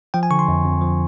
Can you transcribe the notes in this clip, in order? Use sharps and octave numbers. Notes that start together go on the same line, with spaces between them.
F3 G5
G#5
D3 C#6
C6
F2
F2
F3